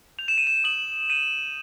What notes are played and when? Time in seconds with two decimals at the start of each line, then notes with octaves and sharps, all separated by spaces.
0.18 G6 F7
0.28 E7
0.38 D#7
0.47 E7
0.64 D#6 F#7
1.10 G6 D#7